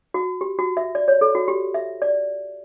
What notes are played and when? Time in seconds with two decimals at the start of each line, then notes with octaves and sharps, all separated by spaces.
0.14 F#4
0.41 G4
0.59 F#4
0.77 E5
0.95 D5
1.08 C#5
1.21 A4
1.35 F#4
1.48 G4
1.74 E5
2.02 D5